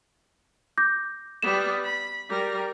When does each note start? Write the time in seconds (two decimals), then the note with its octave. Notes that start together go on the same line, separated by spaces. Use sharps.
0.78 D6 G6 A#6
1.42 G3 B3 E7
1.84 B5
2.29 G3 A#4